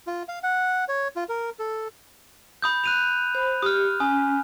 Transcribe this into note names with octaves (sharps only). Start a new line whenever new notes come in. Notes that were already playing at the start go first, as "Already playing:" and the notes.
F4
F5
F#5
C#5
F4
A#4
A4
B5 D#6 G6
F#6 D#7 F7
C5 B5
G4 D#6 F6
C#4 G#5 D#6